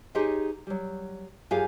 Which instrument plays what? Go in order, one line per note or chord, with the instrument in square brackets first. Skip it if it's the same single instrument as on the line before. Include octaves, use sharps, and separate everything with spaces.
[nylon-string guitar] D#4 G4 G#4 C5 C#5 D#5
F#3 G3
F#2 F4 G4 G#4 F5 G#5